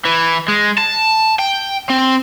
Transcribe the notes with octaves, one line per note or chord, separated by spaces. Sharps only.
E3
G#3
A5
G5
C4